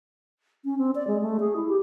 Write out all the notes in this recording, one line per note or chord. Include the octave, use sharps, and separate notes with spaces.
C#4
C4
D5
G#3
A3
G#4
E4
G4